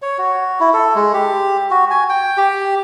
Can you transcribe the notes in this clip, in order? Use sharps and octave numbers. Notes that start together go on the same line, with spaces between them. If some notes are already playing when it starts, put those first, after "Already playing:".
C#5
F#4
E4
A4
G#3
G4
F#4
G#5
G5
G4